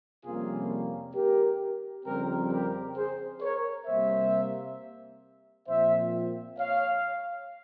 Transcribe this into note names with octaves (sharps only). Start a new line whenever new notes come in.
F2 C3 G3 A#3 C#4 F4 G#4
G4 A#4
F2 C#3 G3 C4 G4 A#4
G4 A#4
G#4 C5
A#4 C#5
C3 G3 A#3 C5 E5
A#2 F3 C4 C5 E5
C#5 F5